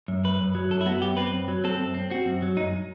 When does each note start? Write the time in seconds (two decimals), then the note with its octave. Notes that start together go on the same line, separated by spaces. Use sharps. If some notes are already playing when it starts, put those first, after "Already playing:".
0.08 F#2
0.24 F#2 B4
0.40 F#2
0.55 F#3
0.70 F#2 A4
0.81 E4
0.86 B3 F#4
1.01 F#2 G4
1.17 C4 B4
1.33 F#2
1.48 F#3
1.64 C4 A4
1.79 F#2
1.94 C4
2.10 C4 F#4
2.26 F#2
2.42 F#3
2.57 F#2 D#4